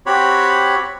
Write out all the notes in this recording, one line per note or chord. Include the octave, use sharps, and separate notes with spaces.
C4 F#4 G4 C#5 B5